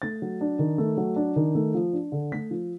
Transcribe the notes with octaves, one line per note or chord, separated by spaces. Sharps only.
A3 A6
F#3
D4
D#3
A3
F#3
D4
D#3
A3
F3
D4
D3
A3 B6
F3